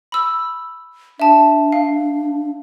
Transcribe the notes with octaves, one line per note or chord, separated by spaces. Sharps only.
B5 E6
D4 E5 A5
F5